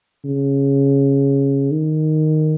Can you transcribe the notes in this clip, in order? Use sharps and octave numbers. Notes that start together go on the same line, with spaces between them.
C#3
D#3